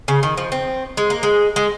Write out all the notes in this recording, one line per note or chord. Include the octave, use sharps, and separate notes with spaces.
C#3
D#3
F3
C4
G#3
A#3
G#3
G#3